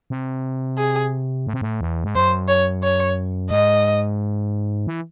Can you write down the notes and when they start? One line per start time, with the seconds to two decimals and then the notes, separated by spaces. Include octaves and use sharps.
0.10 C3
0.78 G#4
1.47 A2
1.54 C3
1.62 A2
1.81 E2
2.04 G#2
2.15 F#2 C5
2.48 C#5
2.83 C#5
3.51 G#2 D#5
4.87 E3